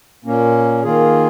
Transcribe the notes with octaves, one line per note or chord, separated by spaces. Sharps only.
A#2 A#3 C#4
D#3 A#3 F4 G#4